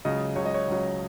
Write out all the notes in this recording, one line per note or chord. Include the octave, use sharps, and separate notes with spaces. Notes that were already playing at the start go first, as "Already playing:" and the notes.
C#2 C#3 F#3 D#5
C#2 C#3 F#3 C#5
D#5
C#5
C#2 C#3 F#3